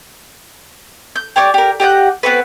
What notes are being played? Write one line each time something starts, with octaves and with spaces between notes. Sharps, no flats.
G6
G4 C#5 D5
G4 A#4
G4 D#5 F#5 G6
B3 C4 F#4 B4